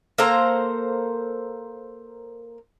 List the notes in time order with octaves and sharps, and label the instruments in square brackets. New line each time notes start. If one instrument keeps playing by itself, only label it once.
[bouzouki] A#3 A4 C5 A#5